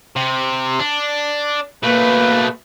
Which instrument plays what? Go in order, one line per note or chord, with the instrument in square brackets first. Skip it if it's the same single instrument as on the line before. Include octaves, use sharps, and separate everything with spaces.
[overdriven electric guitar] C3
D4
[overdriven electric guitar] B2 A3 [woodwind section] A#3 B4